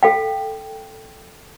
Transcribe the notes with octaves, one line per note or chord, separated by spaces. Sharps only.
A4 F5 G5